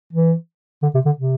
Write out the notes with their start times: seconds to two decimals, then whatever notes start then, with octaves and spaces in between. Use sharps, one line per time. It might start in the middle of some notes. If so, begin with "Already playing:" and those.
0.13 E3
0.83 D3
0.94 C3
1.06 D3
1.19 C3